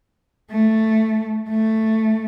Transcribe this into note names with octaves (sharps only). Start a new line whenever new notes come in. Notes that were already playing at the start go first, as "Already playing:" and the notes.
A3
A3